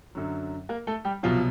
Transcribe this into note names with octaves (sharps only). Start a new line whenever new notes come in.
F#2 D3 F#3
A#3 A#4
A3 A4
G3 G4
C2 B2 F3 F#3 F4